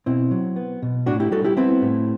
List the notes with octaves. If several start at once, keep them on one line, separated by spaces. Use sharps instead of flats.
B2 C4 E4
F#3
B3
B2
A2 D4 F#4
E4 G4
G3 F#4 A4
E4 G4
B3 C4 E4
A2